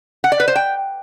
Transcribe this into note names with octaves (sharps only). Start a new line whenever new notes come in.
F#5
D5
B4
C5
G5